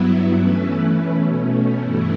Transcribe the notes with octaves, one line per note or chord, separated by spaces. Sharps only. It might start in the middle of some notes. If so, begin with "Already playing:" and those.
Already playing: G2 F#3 B3 E4
E3 A3 C#4 E4 B4
B2 A3 C#4
G2 E3 A3 E4